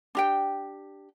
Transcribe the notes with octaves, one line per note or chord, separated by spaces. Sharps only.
D4 G4 G5